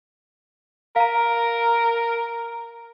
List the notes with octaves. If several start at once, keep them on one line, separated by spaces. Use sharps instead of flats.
A#4 F5 A#5